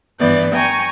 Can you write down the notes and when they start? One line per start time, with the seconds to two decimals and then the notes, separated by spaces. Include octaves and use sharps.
0.19 G2 E3 B3 D5 G6
0.55 G5 G#5 A#5 C#6